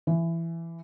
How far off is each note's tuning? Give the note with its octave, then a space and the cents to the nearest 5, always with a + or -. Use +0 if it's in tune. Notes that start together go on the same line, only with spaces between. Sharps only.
E3 +15